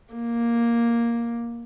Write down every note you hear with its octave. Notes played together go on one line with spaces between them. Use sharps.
A#3